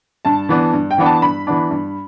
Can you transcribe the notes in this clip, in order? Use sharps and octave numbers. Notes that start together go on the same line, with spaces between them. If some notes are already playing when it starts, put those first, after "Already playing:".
G2 A5
E3 B3 D4
G2
G5
E3 B3 D4
A5
G2 B5
E3 B3 D4
G2